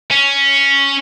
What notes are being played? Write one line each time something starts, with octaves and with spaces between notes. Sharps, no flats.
C#4